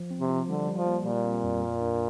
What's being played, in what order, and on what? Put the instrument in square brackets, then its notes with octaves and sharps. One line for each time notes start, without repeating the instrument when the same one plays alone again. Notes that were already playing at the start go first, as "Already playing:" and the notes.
Already playing: [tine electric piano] F3
C4
[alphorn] C3
[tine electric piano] F3
[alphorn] D3 [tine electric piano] G3
[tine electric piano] G3
[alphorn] F3
[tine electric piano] A#3
[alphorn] A#2 [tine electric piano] G3
[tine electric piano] C4
F2
A#4
D4